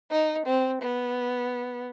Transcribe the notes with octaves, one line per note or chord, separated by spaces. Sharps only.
D#4
C4
B3